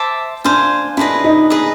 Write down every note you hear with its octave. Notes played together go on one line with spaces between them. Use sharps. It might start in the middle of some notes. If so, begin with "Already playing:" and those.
Already playing: C5 E5 A5 D6
D4 C5 F5 G#5
D4 E4 G#4 B4 D#5
D#4
G#4 B4 D#5